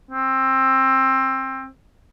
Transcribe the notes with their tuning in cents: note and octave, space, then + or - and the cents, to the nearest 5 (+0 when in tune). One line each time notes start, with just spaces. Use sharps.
C4 +20